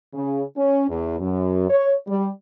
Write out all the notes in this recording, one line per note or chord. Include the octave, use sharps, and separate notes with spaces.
C#3
C#4
E2
F#2
C#5
G3